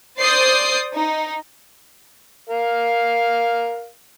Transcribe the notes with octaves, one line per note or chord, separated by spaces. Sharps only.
C5 D5 D#6 G6 A6 C7
D#4
A#4 F5